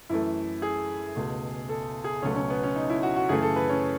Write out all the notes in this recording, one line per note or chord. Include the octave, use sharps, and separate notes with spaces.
F#2 E3 A3 E4
G#4
C#2 B2 A3
A4
G#4
C#2 B2 F#3 A3 C#4
C#4
B3
C#4
D#4
E4
F#4
F#4
F#2 C#3 E3 A3 G#4
A4
B4
C#4